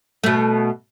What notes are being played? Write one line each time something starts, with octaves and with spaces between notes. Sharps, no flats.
B2 A3